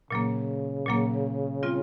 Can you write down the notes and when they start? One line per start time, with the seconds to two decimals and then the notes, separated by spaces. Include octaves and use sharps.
0.10 A#2 C#3 F#3 A#3
0.86 A#2 F#3 A#3
1.63 G3 C4 F4